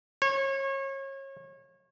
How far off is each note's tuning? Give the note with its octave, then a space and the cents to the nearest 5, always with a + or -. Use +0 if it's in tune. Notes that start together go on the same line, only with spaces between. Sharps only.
C#5 -30